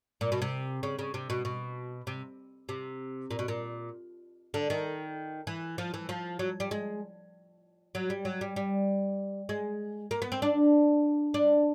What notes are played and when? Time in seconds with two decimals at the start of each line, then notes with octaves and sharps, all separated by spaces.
0.21 A#2
0.32 B2
0.42 C3
0.83 C#3
0.99 C#3
1.14 C3
1.30 B2
1.45 B2
2.07 C3
2.69 C3
3.31 A#2
3.39 B2
3.48 A#2
4.54 D3
4.70 D#3
5.47 E3
5.78 F3
5.94 E3
6.09 F3
6.39 F#3
6.60 G3
6.71 G#3
7.95 F#3
8.10 G3
8.25 F#3
8.41 G3
8.56 G3
9.49 G#3
10.11 A#3
10.22 B3
10.32 C4
10.42 D4
11.34 D4